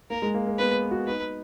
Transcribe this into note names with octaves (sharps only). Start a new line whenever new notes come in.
A#3 A#4
G#3
A#3
A#3
B3 B4
F#4
D#4 B4